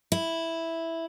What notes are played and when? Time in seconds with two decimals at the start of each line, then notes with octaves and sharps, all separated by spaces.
0.12 E4